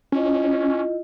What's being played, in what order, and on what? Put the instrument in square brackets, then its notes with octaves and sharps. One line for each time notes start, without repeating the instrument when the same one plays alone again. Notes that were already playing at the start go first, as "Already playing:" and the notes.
[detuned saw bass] C#4 [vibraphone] E4 F4 D#5